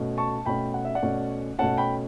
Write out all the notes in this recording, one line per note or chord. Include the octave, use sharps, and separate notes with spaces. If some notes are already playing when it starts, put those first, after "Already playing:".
Already playing: B2 A3 C#4
A5 C#6
B2 A3 C#4 G5 B5
F#5
E5
D5 F#5
B2 A3 C#4
B2 A3 C#4 F#5 A5
G5 B5